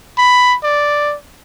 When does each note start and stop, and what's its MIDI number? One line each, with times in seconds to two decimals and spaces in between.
0.18 0.56 83
0.63 1.15 74